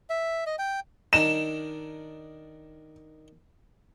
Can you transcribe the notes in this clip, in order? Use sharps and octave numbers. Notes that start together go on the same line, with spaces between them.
E5
D#5
G5
D#3 D4 D#4 E7